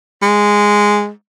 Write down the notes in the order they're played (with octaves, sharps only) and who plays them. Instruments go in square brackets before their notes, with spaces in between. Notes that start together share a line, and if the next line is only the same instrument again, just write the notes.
[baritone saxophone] G#3